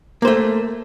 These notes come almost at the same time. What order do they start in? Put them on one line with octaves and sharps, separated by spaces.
A#3 C5 A3